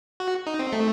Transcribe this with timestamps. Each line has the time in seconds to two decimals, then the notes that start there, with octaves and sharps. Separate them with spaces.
0.20 F#4
0.47 D#4
0.59 C4
0.73 A3